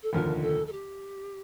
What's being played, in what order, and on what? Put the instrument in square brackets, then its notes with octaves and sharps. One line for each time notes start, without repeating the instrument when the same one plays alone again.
[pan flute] A4
[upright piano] F1 D#2 D3 F3 [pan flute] A#4
[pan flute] A4
A4
G4